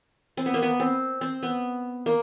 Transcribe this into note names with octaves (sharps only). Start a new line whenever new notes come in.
C4
B3
A#3
B3
C4
C4
B3
A#3